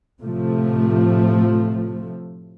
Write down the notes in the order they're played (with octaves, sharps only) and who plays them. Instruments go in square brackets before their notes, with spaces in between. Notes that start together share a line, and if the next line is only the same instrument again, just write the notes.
[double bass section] A2 C3 F3 A3